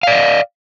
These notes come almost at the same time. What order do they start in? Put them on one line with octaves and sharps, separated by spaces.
F5 D5 D#5